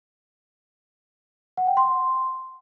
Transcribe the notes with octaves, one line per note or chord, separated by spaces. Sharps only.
F#5
G5
C6